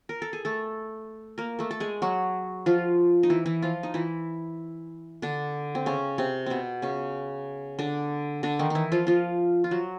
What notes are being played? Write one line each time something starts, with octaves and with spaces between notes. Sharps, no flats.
A#4
A4
G#4
A3 A4
A#3 A#4
A3 A4
A4
G#3 G#4
F#3 F#4
F3 F4
D#4
E3 E4
E3 E4
F3 F4
D#4
E3 E4
D3 D4
C4
C#3 C#4
C3 C4
B2 B3 C4
C#3 C#4
D3 D4
D3 D4
D#3 D#4
E3 D#4 E4
F3 F4
F3 F4
F4
F#3 F#4